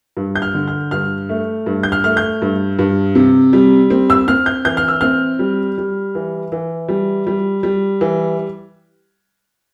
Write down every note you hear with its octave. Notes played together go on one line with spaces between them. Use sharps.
G2
G6
F6
D3
F6
G2 F6
A3
G2
G6
F6
A3 F6
G6
G2
G2
C3
G3
C4
E6
C4 F6
G6
E3 G6
F6
E6
C4 F6
G3
G3
E3
E3
G3
G3
G3
E3